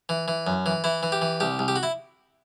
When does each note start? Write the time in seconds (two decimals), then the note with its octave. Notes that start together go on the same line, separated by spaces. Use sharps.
0.09 E3
0.28 E3
0.47 F#2
0.66 E3
0.84 E3 E4
1.03 E3
1.12 G4
1.22 E3
1.40 C2 G4
1.59 C2
1.68 G4
1.76 F#4
1.83 E4